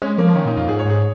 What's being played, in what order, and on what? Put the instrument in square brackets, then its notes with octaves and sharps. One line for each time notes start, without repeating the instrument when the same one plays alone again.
[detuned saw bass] G#3 [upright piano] C#4
[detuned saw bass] F3 [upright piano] A#3
[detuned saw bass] D#3 [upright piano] C#4
[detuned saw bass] A#2 [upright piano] D#4
[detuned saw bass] F2 [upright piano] F4
[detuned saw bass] G#2 [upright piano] G#4
[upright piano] C#5
[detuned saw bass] G#2 [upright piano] G#4